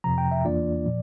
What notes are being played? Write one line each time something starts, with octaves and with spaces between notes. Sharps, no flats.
F2 C3 F3 A#5
G5
E5
E2 E3 A#3 D4 F4 D5
A#2 F3